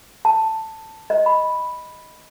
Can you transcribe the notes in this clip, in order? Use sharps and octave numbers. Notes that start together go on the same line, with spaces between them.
A5
D#5
B5